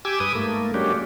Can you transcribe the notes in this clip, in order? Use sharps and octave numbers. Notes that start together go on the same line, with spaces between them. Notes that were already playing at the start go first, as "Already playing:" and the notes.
G4 G#5 D6 E6
G2 B4 D#6
G#2 A3 A#3
F#3 G#3 A#3 C#4 D4 G4